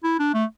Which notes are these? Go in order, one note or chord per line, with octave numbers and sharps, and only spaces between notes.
E4
D4
A3